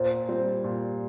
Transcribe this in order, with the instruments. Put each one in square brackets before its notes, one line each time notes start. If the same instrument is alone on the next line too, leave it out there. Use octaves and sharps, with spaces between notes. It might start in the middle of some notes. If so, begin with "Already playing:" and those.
Already playing: [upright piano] A#2 [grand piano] C5
[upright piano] G3 C4
A#2